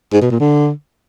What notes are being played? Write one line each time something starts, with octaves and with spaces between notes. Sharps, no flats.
G#2
B2
A#2
D3